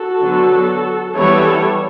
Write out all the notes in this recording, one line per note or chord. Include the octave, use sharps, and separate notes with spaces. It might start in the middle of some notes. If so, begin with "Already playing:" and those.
Already playing: F#4 A4
D3 F#3 B3
E3 G3 B3 A4 C#5